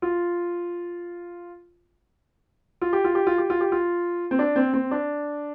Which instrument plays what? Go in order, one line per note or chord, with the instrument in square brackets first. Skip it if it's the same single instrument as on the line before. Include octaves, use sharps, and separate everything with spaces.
[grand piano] F4
F4
G4
F4
G4
F4
G4
F4
G4
F4
C4
D4
C4
C4
D4